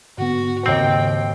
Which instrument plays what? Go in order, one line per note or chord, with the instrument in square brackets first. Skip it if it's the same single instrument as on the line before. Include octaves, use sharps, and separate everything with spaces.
[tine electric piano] G#2 D3 B3 [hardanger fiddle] F#4
[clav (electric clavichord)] D#2 C4 [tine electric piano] G#2 C#3 [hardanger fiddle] G5